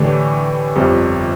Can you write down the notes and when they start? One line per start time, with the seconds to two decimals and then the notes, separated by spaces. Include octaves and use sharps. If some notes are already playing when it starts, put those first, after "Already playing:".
Already playing: A2 D3 E3 A3 D4 G4
0.75 G1 F2 C3 G3